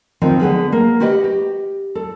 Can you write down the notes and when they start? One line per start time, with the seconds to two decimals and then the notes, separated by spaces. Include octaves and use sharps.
0.22 D#3 F3 C4 D#4
0.40 D3 B3 G#4 B4
0.72 A#3
1.00 F#4 G4 B4 D#5 F#5
1.24 G4
1.95 A4